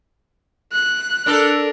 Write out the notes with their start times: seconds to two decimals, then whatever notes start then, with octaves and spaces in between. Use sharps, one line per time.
0.72 F#6
1.26 D4 A4 A#4